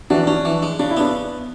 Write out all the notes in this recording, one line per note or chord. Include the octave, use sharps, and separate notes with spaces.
E3 D4 F#4
C#4 D4
E3
G#3
C#3 D4
E4
B3 D4